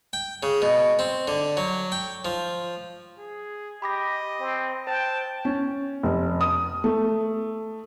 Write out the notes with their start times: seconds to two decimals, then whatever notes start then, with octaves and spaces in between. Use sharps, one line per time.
0.13 G5
0.43 C#3
0.62 B2
0.99 C4
1.28 D3
1.57 F#3
1.92 G5
2.25 F3
3.18 G#4
3.82 G4 D#5 B5 D6 A#6
4.40 C4
4.87 C5 G5 A5
5.45 C#4
6.03 F1
6.41 D#6
6.84 A3